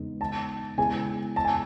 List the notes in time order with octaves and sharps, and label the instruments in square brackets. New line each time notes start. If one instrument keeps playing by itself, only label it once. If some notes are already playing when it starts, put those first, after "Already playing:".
Already playing: [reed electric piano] E2 C#3 G#3 B3 D#4
[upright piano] A5
[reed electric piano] C#3 G#3 B3 E4 G#4 [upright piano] G#5
[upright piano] A5
G#5